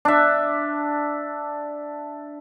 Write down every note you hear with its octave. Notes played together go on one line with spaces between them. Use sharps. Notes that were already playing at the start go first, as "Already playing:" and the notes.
D4 E5